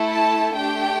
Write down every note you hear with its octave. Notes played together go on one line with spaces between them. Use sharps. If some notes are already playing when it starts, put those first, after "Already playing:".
Already playing: A3 E4 A4
A5
A3 D4 G4 G5